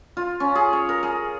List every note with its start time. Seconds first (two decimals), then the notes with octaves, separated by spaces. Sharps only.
0.17 F4
0.40 C#4
0.55 G#4
0.73 C#5
0.89 A#4
1.03 G#4